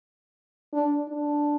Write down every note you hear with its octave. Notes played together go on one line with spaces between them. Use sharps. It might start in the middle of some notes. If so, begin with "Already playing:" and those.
D4
D4